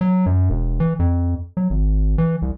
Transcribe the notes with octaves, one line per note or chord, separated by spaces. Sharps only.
F#3
F#2
E1
E3
F2
F#3
G#1
E3
C2